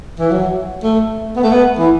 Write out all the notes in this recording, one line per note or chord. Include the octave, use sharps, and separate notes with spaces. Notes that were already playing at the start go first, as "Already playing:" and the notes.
E3
F#3
A3
B3
A3
B3
E3